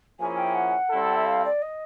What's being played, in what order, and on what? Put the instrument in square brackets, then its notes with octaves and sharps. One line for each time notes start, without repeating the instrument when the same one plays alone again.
[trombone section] F3 A#3 C#4 E4 G#4 [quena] G#5
[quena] G5
F#5
[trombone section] G3 C4 E4 A4
[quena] E5
F5
D5
D#5